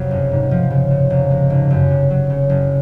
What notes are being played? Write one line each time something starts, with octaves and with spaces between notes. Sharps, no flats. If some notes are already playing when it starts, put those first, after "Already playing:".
Already playing: F2 C3 F#3
F#1
G#2
F3
C#3
C#3
F1
G#3
G#1
F#2
C3
F#3
C#3
F#1